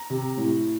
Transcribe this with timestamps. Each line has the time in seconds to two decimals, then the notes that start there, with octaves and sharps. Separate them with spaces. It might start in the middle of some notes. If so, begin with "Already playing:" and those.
Already playing: A#5
0.10 C3
0.37 A2